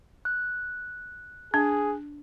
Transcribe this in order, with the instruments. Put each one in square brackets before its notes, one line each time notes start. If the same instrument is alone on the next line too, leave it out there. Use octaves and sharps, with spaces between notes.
[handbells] F#6
[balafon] D4 [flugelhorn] G#4